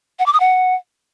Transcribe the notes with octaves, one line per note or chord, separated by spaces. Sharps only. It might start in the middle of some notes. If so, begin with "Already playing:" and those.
F#5
D6
D#6
F#5